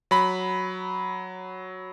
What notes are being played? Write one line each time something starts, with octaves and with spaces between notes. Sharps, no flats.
F#3 B5